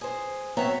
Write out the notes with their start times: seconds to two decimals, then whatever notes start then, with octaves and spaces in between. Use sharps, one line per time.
0.01 G#4 C5
0.57 F#3 B3 C4 C#5 E5 A#5